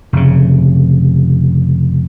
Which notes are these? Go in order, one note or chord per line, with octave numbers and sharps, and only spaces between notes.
F1 C#3